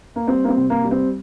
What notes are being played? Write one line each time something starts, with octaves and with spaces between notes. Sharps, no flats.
A#3
G3 C4
A#3
C4
C3
A#3
G3
C4